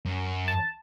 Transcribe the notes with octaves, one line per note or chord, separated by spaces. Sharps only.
F#2
A5